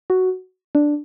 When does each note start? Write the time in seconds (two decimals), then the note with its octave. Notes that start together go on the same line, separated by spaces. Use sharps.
0.10 F#4
0.75 D4